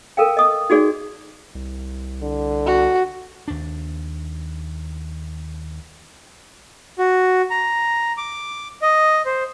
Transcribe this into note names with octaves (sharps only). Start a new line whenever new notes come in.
A4 A#4 F5 G5
D#5 D#6
D#4 F#4 G#4 D5
C2
D3
F#4
D#2 D4
F#4
A#5
D6
D#5
C5